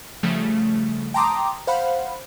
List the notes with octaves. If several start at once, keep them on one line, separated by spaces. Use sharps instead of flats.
C#3 F3 G3 A3
G5 A5 A#5 C6 D6 D#6
C5 F5 F#5 B5